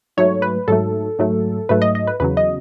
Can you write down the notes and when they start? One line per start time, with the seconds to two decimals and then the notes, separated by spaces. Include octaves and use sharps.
0.17 G#2 F#3 A3 C#5
0.42 B4
0.68 G#2 F#3 A3 A4
1.19 G#2 F#3 A3
1.69 G#2 F#3 A3 B4
1.82 D#5
1.95 D#5
2.07 B4
2.20 E2 C#3 F#3 B4
2.37 D#5